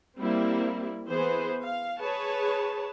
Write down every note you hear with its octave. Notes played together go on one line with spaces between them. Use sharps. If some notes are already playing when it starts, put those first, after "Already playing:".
G3 A#3 C4 E4
E3 B3 G#4 B4 C5
F5
G#4 B4 C#5 A5